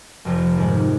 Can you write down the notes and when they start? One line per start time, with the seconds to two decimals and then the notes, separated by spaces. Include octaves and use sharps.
0.25 F1 F2 C3 F3
0.57 G#2 D#3 G#3